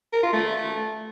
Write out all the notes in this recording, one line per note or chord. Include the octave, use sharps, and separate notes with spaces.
A#4
F4
A3